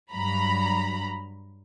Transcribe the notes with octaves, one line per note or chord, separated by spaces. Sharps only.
G2 F#3 A#5 B5